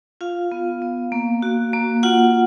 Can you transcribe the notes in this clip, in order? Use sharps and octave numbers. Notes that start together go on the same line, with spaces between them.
F4 F5
B3
B3
A#3
F#4
A#3
F4 F#5